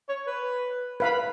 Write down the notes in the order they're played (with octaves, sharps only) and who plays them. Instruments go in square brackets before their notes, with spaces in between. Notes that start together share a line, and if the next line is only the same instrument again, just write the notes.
[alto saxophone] C#5
B4
[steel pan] B4 F5 B5